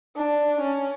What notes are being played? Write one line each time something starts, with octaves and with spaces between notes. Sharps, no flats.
D4
C#4